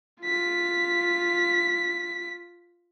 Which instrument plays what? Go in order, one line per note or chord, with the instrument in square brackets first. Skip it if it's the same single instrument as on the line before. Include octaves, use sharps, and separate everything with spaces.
[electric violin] F4 B6